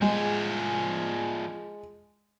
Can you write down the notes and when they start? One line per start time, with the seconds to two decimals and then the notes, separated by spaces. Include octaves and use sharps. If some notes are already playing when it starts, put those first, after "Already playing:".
0.02 F3 G#3 G#4